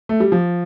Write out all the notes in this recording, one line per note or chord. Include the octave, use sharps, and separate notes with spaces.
A3
G3
F3